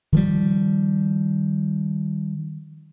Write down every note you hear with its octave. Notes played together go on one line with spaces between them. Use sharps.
D#3 F3 G3